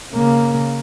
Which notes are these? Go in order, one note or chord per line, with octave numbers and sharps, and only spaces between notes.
C#3 A#3